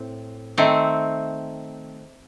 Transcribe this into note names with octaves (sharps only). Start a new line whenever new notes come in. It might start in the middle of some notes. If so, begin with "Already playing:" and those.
Already playing: A2 C4
D#3 A3 C4